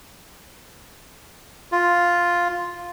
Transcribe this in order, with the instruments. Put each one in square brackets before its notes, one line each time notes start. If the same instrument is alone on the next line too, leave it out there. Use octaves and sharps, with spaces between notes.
[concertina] F4